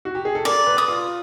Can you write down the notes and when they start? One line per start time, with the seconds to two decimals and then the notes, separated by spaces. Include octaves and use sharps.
0.05 F#4
0.15 G4
0.25 G#4
0.35 A4
0.45 A#4 D5
0.66 B4
0.78 D#6
0.88 F4